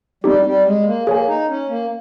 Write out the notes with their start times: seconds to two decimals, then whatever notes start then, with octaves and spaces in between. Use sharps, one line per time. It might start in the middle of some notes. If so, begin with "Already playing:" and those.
0.24 G3 C4 D#4 G4
0.45 G3
0.66 G#3
0.87 A#3
1.07 A#3 G#4 C#5 G#5
1.28 D#4
1.49 C#4
1.69 A#3